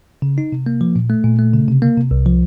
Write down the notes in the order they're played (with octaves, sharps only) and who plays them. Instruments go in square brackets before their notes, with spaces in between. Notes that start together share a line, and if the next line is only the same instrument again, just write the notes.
[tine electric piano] C#3
D#4
C3
A#3
F3
A#2
A3
A#2
A3
C#3
C3
A#3
C3
C2
F3